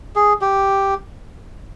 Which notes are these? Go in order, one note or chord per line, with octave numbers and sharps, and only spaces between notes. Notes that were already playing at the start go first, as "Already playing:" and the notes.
G#4
G4